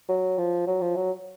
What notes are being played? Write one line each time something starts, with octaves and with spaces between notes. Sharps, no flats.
F#3
F3
F#3
F3
F#3